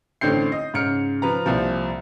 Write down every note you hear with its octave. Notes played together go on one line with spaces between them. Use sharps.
A1 D3 C4 G6 C7
D#5
G#2 C#3 F6 C#7
F3 B4 A#5
C2 A#2 F3